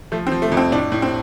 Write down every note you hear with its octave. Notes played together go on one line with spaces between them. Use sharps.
F3 A3
C4
F3
A3
F2
C4
A2 D4
A2
C4